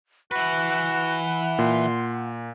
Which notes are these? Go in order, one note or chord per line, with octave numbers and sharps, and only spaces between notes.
E3 F#4 B4 F#5
A#2 C6